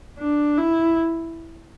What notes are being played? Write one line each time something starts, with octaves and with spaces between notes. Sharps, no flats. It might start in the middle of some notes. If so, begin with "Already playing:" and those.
D4
E4